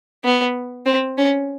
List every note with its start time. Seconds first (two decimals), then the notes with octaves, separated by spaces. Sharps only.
0.24 B3
0.86 C4
1.18 C#4